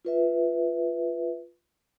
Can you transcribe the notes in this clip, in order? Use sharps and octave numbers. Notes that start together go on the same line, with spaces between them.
F4 B4 E5